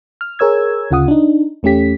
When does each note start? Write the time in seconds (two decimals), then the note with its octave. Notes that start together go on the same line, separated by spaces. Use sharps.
0.21 F6
0.39 G#4 A#4 C#5 E6 G#6
0.91 D2 C#3 F4 F#5 D#6
1.08 D4 D#4
1.63 E2 A3 C#4 G4 B6